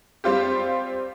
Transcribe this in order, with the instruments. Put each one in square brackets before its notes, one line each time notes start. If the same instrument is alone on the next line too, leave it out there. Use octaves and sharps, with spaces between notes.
[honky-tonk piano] G3 C4 F4 G4